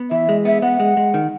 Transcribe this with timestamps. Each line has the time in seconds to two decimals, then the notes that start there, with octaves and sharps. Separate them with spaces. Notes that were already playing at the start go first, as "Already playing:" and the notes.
Already playing: B3
0.11 E3 E5
0.29 G#3
0.45 B3 E5
0.62 B3 F#5
0.80 G#3
0.97 G#3
1.14 D#3